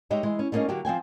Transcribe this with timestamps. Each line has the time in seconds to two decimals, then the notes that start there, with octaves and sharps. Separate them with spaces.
0.10 G#3 D#4 G4 C#5 E5
0.23 E3 G#3
0.39 C#4
0.52 G3 A3 A#3 C#4 D#4 G#4
0.69 D3 F#3 A#3 F#4 G4
0.85 F3 C4 G5 G#5